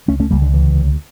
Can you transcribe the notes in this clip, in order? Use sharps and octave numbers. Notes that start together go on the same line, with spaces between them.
C#2 A3 C#4
A3 C#4
C#2 G3 A#3
D3
D2 E3
D2